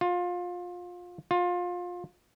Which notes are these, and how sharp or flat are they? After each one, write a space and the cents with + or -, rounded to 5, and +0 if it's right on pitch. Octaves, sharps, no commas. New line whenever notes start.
F4 +25
F4 +25